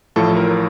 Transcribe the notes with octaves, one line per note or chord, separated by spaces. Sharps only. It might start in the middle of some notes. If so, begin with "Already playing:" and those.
A1 A2 F3 A4
A#4